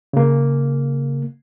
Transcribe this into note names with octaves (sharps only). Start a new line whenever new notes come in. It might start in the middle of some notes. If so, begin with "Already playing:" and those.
C#3 A#3